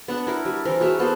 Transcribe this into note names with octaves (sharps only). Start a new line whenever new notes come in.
B3 D4 F#5
E4 A#4
G3
E3 C4 A#4
F#4 G#4 C#5 E5
B3 A4 C5